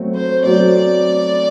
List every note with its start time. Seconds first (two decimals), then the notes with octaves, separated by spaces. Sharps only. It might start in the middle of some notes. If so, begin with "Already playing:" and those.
Already playing: F#3 A3 C4 F#4
0.15 C5
0.45 F#3 A3 C4 F#4 D5